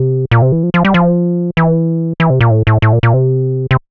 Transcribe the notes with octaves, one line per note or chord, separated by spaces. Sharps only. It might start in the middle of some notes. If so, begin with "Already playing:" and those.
Already playing: C3
A#2
C3
E3
F3
F3
G3
F3
E3
E3
C3
A#2
A2
A2
A2
A#2
A#2
C3
C3